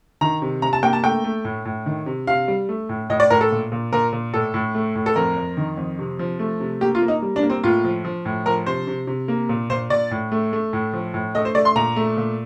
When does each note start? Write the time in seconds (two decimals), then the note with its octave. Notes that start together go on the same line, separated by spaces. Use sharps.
0.21 D#3 A#5
0.42 C3
0.62 C3 A#5
0.73 A5
0.83 A#3 G5
0.93 A5
1.04 A3 G5
1.24 A3
1.45 A2
1.65 A2
1.86 D#3
2.06 C3
2.27 C3 F5
2.48 G3
2.69 A3
2.89 A2
3.10 A2 D#5
3.20 D5
3.30 A2 A#4
3.41 A4
3.51 A#2
3.72 A#2
3.93 A#2 A#4
4.12 A#2
4.33 A2 A4
4.54 A2
4.75 A3
4.95 A2
5.06 A4
5.16 F2 A#4
5.37 F2
5.57 D#3
5.77 F2
5.99 C3
6.19 F3
6.39 A3
6.60 C3
6.81 A#3 G4
6.95 F4
7.02 A#3
7.08 D#4
7.22 G3
7.36 D4
7.43 A#3
7.50 C4
7.64 A2 F4
7.84 F3
8.05 F3
8.25 A2
8.46 F3 A#4
8.66 C3 C5
8.87 C3
9.07 C3
9.28 A#3
9.49 A#2
9.70 A#2 C5
9.90 A#2 D5
10.11 A2
10.32 A3
10.53 A3
10.73 A2
10.93 F3
11.14 A2
11.35 A3 D#5
11.45 C5
11.55 A3 D5
11.65 C6
11.76 A#2 A#5
11.96 A3
12.17 A#2